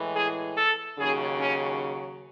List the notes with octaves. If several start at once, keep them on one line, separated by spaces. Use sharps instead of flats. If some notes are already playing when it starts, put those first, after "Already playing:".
Already playing: A2 E3 G#3
G#4
A4
D#2 C#3 F#3 G#4
C#4